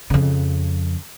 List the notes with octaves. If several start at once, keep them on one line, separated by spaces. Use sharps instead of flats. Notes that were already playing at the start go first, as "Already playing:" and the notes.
F2 C#3